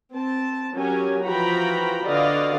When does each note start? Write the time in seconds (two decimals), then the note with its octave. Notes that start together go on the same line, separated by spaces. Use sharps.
0.14 C4 A5
0.75 F#3 C#4 G4 A#4 G#5
1.24 E3 F3 F#4 G5 A#5 B5
2.05 D3 F#4 B4 D5 D#5 F5